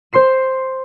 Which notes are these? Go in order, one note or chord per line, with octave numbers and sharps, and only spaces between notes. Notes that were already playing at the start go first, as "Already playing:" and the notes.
C5 C6 C7 E7